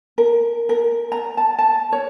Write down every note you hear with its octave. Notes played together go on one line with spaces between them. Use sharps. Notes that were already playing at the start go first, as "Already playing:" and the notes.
A#4
A#4
A#5
A5
A5
C#5